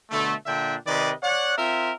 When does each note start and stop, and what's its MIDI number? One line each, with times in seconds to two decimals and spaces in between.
0.11 0.34 47
0.11 0.34 50
0.11 0.34 57
0.46 0.76 46
0.46 0.76 50
0.46 0.76 62
0.46 0.76 76
0.46 0.76 79
0.86 1.12 48
0.86 1.12 51
0.86 1.12 71
0.86 1.12 74
0.86 1.12 75
1.23 1.57 73
1.23 1.57 74
1.23 1.57 78
1.57 1.92 60
1.57 1.92 65
1.57 1.92 70
1.57 1.92 76